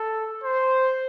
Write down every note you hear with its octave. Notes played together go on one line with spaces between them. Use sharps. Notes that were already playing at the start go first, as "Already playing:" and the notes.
Already playing: A4
C5